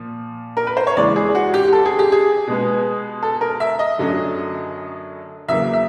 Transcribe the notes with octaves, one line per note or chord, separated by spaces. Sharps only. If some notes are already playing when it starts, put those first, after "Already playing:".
Already playing: A#2 F3
A#4
B4
C5
C#5
E2 C#3 E3 G#3 D5
G#4
F#4
G4
A4
G#4
G4
G#4
B2 G#3 B3
A4
A#4
E5
D#5
F#2 D3 F#3 A3 C#4
E2 C#3 F#3 A#3 E5
E5